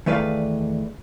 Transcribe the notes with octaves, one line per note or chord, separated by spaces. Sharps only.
E2 D#3 A3 B4 D5 F5